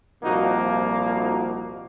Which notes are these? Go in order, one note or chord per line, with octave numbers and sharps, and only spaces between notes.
C2 A#2 F3 A#3 D#4 F#4
D#4 F#4